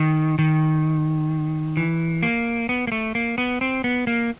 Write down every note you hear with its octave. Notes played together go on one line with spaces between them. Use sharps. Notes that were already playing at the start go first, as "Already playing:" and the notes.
Already playing: D#3
D#3
E3
A#3
B3
A#3
A3
A#3
B3
C4
B3
A#3